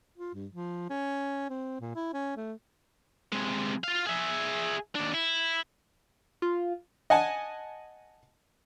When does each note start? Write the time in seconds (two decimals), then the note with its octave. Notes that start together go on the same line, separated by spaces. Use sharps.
0.18 F4
0.34 G2
0.52 F3
0.90 C#4
1.50 C4
1.81 A#2
1.95 E4
2.14 C#4
2.37 A3
3.32 C3 G#3
3.84 F4 F5
4.07 G#4 E5
4.95 D#2 D4
5.14 E4
6.42 F4
7.10 D#5 F#5 G#5 A5